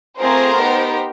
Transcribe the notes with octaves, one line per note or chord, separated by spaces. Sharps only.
A3 C4 F4 G#4 A#4 C5
B3 D#4 G4